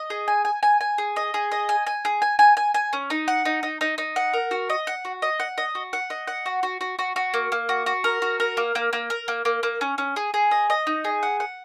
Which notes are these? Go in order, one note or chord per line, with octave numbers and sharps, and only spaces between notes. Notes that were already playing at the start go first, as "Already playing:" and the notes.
Already playing: D#5
G#4
G#5
G#5
G#5
G#5
G#4
D#5
G#4
D#5
G#5
G#5
G#4
G#5
G#5
G#5
G#5
C#4
D#4
F#5
D#4
D#4
D#4
D#4
F#5
A#4
F#4
D#5
F#5
F#4
D#5
F#5
D#5
F#4
F#5
D#5
F#5
F#4
F#4
F#4
F#4
F#4
A#3
A#3
F#4
F#4
A#4
F#4
A#4
A#3
A#3
A#3
A#4
A#3
A#3
A#3
C#4
C#4
G#4
G#4
D#5
D#5
D#4
G#4
F#5
F#5